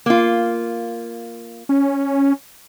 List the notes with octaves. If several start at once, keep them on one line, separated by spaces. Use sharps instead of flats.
A#3 F4
C#4